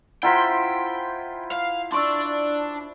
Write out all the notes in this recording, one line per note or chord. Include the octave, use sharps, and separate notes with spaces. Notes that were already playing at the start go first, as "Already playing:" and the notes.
E4 F4 C5 F#5 G5 A#5 B6
F5
D4 D5 C6 C#6 E6